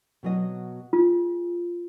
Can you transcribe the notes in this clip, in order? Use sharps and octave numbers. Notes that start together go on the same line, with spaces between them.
B2 F#3 D#5
F4 G#4